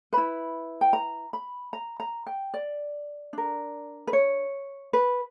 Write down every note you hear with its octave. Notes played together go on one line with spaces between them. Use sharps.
E4 B4 B5
G5
A#5
B5
A#5
A#5
G5
D5
D4 A#4
B4
C#5
B4